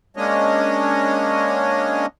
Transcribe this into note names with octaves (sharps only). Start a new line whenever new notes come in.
G#3 A#3 C#4 D4 C#5 D#5